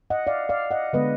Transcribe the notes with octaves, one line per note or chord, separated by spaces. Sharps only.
D#5 F#5
D5 F5
D5 F5
D#5 F#5
D3 G#3 B3 B4 D#5